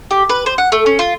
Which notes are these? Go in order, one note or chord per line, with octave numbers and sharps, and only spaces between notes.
G4
B4
C5
F#5
A3
C#4
F4